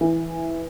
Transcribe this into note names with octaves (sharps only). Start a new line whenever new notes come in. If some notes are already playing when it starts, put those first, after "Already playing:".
E3